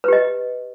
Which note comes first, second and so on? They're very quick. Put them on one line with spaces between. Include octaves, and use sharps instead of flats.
B4 G4 D#5